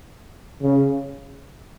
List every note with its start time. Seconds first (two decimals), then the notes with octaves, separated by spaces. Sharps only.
0.63 C#3